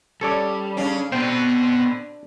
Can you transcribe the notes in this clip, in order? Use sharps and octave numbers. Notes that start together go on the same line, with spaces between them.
G3 C#4 A4 C#5 D5
C#3 C#4 D4
B2 D3 C4 B4 C5 G5